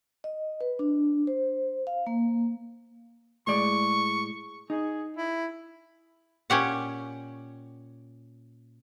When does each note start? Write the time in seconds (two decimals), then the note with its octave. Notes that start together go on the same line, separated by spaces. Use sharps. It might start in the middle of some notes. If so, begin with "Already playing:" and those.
0.24 D#5
0.61 B4
0.79 D4
1.27 C5
1.87 F5
2.07 A#3
3.47 A2 G#3 D5 C#6
4.70 D#4 G#4
5.17 E4
6.50 A#2 C#4 G4 F#5